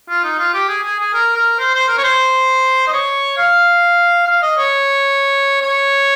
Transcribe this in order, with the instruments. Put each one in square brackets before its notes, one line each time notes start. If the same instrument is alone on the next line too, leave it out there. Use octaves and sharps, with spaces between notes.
[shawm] F4
D#4
F4
G4
G#4
G#4
G#4
A#4
A#4
C5
C5
A#4
C#5
C5
D#5
C#5
F5
F5
D#5
C#5
C#5